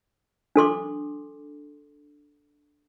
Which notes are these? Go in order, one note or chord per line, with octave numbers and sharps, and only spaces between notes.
D4 A4 C6 D6